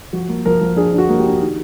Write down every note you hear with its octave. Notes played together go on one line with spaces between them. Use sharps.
F3 F#4
A#3
F3 A#4
F3
D4 G#4
D4
F#4
A#3
G4
D4
D#3